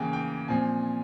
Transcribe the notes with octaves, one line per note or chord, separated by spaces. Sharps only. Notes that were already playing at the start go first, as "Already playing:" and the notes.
Already playing: C#3 E3 A#3 G5 G#5
G5
A#2 F3 C4 G#5